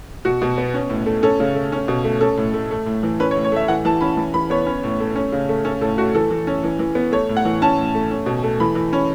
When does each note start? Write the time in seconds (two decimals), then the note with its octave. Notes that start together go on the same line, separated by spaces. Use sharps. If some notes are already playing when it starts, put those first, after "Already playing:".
0.25 B2 F#4
0.42 B2
0.58 B3
0.74 C#4
0.90 A2
1.06 A3
1.23 C#4 A4
1.40 C#3
1.55 A3
1.72 C#4
1.88 B2
2.04 A3
2.21 C#4 A4
2.37 A2
2.54 A3
2.71 A3
2.86 A2
3.03 E3
3.20 C#4 B4
3.31 C#5
3.36 A2
3.45 C#5
3.52 A3 E5
3.68 E3 F#5
3.85 E3 A5
4.01 C#4 B5
4.17 E3
4.34 E3 B5
4.50 B3 C#5
4.66 C#4
4.84 A2
5.00 A3
5.15 C#4
5.32 C#3
5.49 A3
5.65 C#4 A4
5.81 A2 A4
5.98 A3 F#4
6.15 E3 A4
6.30 E3
6.47 C#4
6.64 E3
6.79 E3
6.95 B3
7.12 A3 C#5
7.29 A2
7.37 F#5
7.45 E3
7.62 C#4 A5
7.78 A2
7.95 A3
8.11 C#4
8.26 B2
8.43 A3
8.60 E3 B5
8.75 E3
8.93 C#4